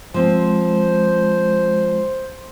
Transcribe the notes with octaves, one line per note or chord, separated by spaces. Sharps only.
F3 G#3 C4 C5